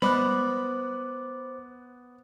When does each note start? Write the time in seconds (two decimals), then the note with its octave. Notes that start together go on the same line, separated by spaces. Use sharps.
0.02 G3 G#3 B3 C5 B5 D6 F#6